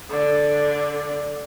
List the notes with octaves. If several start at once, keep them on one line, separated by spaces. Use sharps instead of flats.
D3 D5